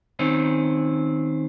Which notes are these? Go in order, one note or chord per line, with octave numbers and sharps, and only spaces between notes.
D#3 C4 C#4